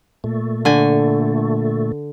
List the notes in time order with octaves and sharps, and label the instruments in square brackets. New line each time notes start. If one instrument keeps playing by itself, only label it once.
[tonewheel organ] A#2 A3
[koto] D3 G#5